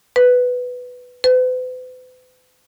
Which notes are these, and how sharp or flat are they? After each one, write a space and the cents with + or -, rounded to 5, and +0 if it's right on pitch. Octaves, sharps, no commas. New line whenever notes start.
B4 +5
B4 +45